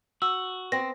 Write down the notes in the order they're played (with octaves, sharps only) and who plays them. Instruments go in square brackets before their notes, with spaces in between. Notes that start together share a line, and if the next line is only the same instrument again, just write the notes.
[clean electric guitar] F#4 [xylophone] E6
[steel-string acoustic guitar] B3 C4 [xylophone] A#6